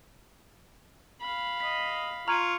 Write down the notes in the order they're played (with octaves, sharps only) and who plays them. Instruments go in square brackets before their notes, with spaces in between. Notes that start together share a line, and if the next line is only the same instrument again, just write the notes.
[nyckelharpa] F5 B5
[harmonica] D#5 [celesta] B6
[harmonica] F4 C#6 [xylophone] A#5 [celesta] F6 G#6 D#7